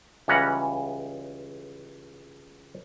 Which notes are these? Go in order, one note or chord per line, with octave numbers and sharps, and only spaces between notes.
C#2 E3 G3 C#4 F#5 A#5